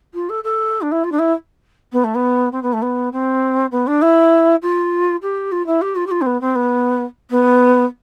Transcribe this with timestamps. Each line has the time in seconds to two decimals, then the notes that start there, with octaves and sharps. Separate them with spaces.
0.14 F4
0.29 A4
0.44 A4
0.81 D4
0.91 E4
1.04 F4
1.12 D4
1.19 E4
1.92 B3
2.04 A3
2.15 B3
2.52 C4
2.62 B3
2.73 A3
2.82 B3
3.12 C4
3.71 B3
3.87 D4
4.02 E4
4.62 F4
5.22 G4
5.52 F4
5.66 E4
5.81 G4
5.95 F4
6.06 G4
6.11 F4
6.21 C4
6.26 B3
6.41 C4
6.55 B3
7.30 B3